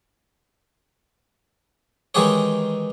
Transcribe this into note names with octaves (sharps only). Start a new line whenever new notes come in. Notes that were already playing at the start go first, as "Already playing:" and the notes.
D#3 E3 G#3 G4 G#4 C#5